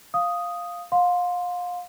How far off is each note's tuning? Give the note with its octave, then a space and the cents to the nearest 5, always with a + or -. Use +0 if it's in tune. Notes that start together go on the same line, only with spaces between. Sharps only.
F5 +0 D#6 +0
F5 +30 C6 +0